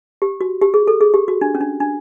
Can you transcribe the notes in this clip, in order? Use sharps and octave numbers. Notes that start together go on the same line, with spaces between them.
G4
F#4
G4
G#4
A4
G#4
G4
F#4
D4
C#4
D4
D4